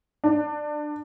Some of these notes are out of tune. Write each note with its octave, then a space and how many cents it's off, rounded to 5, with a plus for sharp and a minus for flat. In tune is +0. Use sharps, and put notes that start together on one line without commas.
D4 +25